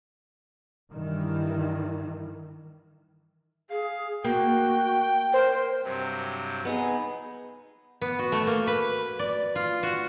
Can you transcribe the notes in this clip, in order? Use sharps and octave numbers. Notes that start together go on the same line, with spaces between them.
G2 D#3 E3
G#4 F5
A#3 F#4 G5
A#4 C5
G2 C3 F#3
B3 D#4 G#4
B3
F#4
A3
A#3
B4
D5
F4
F#4